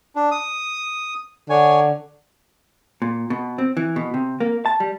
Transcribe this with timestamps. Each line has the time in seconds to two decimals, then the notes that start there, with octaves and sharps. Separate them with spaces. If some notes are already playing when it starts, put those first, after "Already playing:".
0.16 D4
0.31 D#6
1.50 D3 C#5 G#5
3.02 A#2
3.30 B2
3.58 C4
3.77 E3
3.96 B2
4.14 C3
4.40 A#3
4.66 A5
4.80 G3